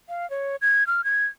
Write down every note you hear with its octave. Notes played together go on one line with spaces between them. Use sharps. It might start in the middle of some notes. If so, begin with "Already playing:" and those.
F5
C#5
G#6
F6
G#6